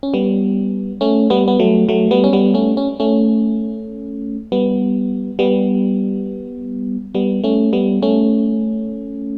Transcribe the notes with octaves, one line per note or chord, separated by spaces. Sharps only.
C#4
G3 B3
A3 C#4
G3 B3
B3
F#3 A3
F#3 A3
G3 B3
C#4
G3 B3
A3 C#4
C#4
A3 C#4
G3 B3
G3 B3
G3 B3
A3 C#4
G3 B3
A3 C#4